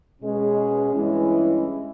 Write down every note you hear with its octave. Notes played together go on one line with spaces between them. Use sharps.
B2 G#3 C#4
G2 E3 G#3 C#4 E4